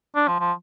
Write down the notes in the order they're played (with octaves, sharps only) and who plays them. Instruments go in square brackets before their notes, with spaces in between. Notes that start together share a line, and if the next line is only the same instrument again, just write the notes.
[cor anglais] D4
F3
F3